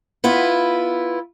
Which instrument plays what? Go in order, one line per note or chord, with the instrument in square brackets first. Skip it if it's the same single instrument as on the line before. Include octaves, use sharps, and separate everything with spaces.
[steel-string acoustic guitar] B3 E4 F4